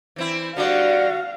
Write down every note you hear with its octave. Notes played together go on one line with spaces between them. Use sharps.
E3 C4 E4
D3 G3 F#4 D5 F5